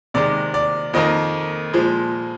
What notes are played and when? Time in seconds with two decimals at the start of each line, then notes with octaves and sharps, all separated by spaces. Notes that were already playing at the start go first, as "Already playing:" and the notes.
0.14 C3 D#3 G#3 D5
0.54 D5
0.94 F2 D#3 A#3 D#5
1.73 A#2 F3 G#3